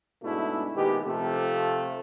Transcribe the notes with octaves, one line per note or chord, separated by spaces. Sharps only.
G#2 B2 G#3 A3 D4 E4
A#2 D#3 G#3 B3 G4
C3 F3 A3